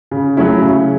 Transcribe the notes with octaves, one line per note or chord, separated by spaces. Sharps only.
C#3
F#3 A3 C#4 E4
C#3